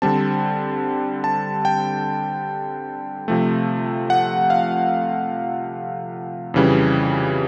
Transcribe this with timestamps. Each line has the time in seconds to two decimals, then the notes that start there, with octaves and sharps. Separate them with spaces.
0.02 D3 G3 C4 A5
1.24 A5
1.65 G5
3.28 C3 F3 A3
4.10 F#5
4.50 F5
6.54 F2 C#3 E3 G3